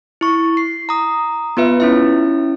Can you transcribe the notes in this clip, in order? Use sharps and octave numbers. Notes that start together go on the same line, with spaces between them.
E4 C#6
C7
A#5 D#6
B3 F4 B4 E5
C#4 E4 E5